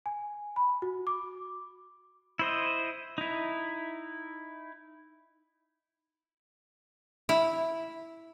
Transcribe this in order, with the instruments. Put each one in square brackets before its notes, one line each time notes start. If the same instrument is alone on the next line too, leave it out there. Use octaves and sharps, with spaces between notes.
[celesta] G#5
B5
F#4
D6
[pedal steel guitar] E4 C5 D#5
D#4 E4
[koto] E4